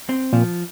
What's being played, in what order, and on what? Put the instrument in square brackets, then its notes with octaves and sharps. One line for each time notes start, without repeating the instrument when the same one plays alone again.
[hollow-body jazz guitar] C4
[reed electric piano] A#2 [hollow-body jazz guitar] F3